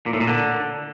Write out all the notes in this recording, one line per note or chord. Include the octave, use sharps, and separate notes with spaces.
A#2
A2
A#2
D3